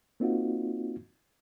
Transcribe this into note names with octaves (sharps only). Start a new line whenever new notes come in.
A#3 C4 D#4 F4 F#4